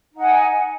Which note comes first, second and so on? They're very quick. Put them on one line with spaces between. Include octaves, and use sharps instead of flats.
D#4 F#5 G#5